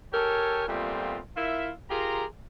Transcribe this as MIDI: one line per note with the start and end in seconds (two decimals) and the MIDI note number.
0.13 0.63 67
0.13 0.63 69
0.13 0.63 70
0.13 0.63 73
0.13 0.63 80
0.13 0.63 81
0.68 1.18 46
0.68 1.18 55
0.68 1.18 57
0.68 1.18 59
0.68 1.18 60
0.68 1.18 65
1.36 1.70 64
1.36 1.70 65
1.36 1.70 70
1.36 1.70 76
1.90 2.24 65
1.90 2.24 67
1.90 2.24 68
1.90 2.24 70
1.90 2.24 82
1.90 2.24 84